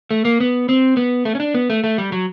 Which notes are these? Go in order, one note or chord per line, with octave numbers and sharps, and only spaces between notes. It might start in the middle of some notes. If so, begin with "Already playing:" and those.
A3
A#3
B3
C4
B3
A3
C#4
D4
B3
A3
A3
G3
F#3